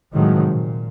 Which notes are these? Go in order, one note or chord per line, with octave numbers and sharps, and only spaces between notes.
A2 C3 D#3 F3 F#3 G#3
A#2